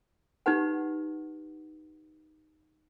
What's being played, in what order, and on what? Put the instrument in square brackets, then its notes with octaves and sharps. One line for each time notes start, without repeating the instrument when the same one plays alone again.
[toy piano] D#4 G4 B4 F#5